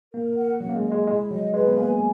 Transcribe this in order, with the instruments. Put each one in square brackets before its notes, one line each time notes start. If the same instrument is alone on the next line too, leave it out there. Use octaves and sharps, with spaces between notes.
[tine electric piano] A#3 [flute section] A#4
[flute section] F#5
[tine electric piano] F#3 [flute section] C#4
[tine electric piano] A#3
G#3
[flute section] D#5
[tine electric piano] G#3
[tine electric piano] G#3 [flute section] E4
[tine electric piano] F#3 [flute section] D#5
[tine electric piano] G#3 [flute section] B4
[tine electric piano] B3
[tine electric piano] A#3 [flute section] G#5